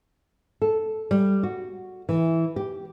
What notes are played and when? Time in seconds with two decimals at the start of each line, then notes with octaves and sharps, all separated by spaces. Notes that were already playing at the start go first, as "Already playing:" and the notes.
0.62 A4
1.11 G3
1.43 F#4
2.09 E3
2.56 G4